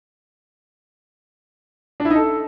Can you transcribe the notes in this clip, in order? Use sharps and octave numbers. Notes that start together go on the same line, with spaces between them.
D4
E4
D#4
A4